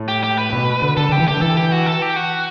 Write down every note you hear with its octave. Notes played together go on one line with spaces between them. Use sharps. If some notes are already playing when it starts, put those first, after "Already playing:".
Already playing: A2
G4
G4
B4
B2
D3
D3 A4
D3 G4
E3
D3 G4
E3 A4
G4
F#4
A4
G4
F#4